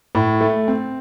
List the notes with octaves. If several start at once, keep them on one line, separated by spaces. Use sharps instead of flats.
A2
A3
C4